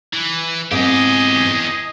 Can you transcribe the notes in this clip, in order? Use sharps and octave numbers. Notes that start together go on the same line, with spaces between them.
E3
E2 G#2 C4 G4 G#4 D#5